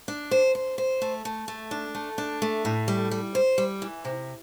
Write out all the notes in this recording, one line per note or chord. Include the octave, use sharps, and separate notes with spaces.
D4
C5
C5
C5
A3
A3
A3
D4
A3
D4
A3
A2
G3
G3
C5
G3
E3
C3